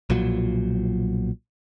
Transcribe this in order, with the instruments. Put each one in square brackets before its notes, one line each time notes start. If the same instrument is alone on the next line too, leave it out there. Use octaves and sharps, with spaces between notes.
[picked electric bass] B1 A#2 F3 F#3